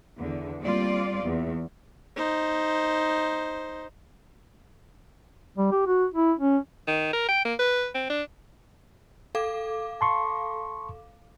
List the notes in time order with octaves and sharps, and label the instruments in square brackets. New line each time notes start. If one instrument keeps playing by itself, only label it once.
[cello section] E2 D3
G3 A#3 C4 F4 D5
E2
[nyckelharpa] D#4 C5
[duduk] G3
G4
F#4
E4
C#4
[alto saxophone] D#3
A#4
G5
A#3
B4
C4
D4
[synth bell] A4 F5 D6
[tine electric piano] A5 C6 C#6